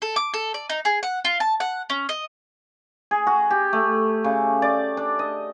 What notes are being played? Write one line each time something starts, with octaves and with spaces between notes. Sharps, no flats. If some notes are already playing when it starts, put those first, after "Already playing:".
A4
D6
A4
D5
D#4
G#4
F#5
F4
A5
F#5
C#4
D#5
G#4
F#4
G4
A3
C#3
D5
D4
D#5